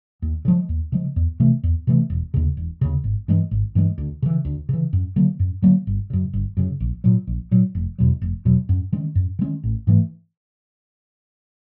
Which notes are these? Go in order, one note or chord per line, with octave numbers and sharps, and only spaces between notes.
D#2
C#3
F3 G#3
D#2
C#3 F3 G#3
E2
C3 E3 A3
E2
C3 E3 A3
E1
D#2 C#3
E1
D#2 C#3
G#1
G2 E3 G#3
G#1
G2 E3 G#3
D2
C#3 E3
D2
C#3 E3
F#2
D3 F#3 A#3
F#2
D3 F#3 A#3
G1
F#2 C#3
G1
F#2 C#3
A#1
A#2 F#3
A#1
A#2 F#3
F1
E2 B2 F#3
F1
E2 B2 F#3
F#2
D#3 G#3 C#4
F#2
D#3 G#3 C#4
A1
G#2 E3 A3